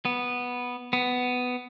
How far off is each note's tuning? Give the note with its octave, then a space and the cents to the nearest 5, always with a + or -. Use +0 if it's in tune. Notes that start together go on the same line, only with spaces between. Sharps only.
B3 -5
B3 +10